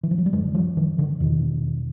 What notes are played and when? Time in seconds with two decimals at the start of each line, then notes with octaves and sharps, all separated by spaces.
0.03 E3
0.11 F3
0.18 F#3
0.26 G3
0.33 F#2 D3 F#3 G#3
0.54 F3 G3
0.77 D#3 F3
0.98 D3 E3
1.20 E2 B2 D#3